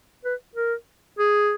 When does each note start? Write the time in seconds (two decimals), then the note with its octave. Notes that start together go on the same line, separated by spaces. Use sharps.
0.25 B4
0.55 A#4
1.19 G#4